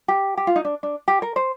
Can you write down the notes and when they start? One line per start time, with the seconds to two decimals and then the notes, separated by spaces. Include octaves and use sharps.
0.08 G4
0.37 G4
0.47 F4
0.56 D#4
0.65 D4
0.83 D4
1.08 G4
1.22 A#4
1.36 C5